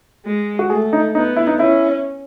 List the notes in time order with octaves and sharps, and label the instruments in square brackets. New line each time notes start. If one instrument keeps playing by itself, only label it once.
[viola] G#3
[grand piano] F#4
[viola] A3 [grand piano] G#4
[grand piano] D#4
[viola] B3 [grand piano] D#4
[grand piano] E4
D#4
[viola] C#4 [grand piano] E4